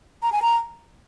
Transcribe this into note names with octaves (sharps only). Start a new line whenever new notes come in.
A#5
G#5
A#5